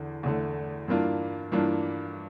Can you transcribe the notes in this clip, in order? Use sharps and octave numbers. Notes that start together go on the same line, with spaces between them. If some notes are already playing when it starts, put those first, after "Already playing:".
Already playing: E2 D3
E2 D3 A3
G2 E3 A#3 D4 F4
G2 E3 A#3 D4 F4